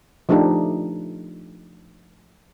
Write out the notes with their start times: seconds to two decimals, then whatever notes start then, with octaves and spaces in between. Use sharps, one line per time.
0.29 F3 A3 D4 D#4 G4